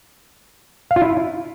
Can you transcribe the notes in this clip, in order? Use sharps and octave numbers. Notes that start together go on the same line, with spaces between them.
F5
F4
E4